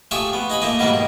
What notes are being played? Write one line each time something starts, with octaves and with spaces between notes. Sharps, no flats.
F3 A3 G4 G#4 E5 C#6
B3
D#4 G#4 B5
F3 A3 A#3 D#4
G#2 B2 D#3 F3 G3 A#3
D#3